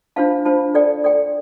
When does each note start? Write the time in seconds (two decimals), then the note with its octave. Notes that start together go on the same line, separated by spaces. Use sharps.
0.16 D4 F4 C5 F5 A5
0.45 D4 F4 C5 F5 A5
0.74 A4 D5 G5
1.04 A4 D5 G5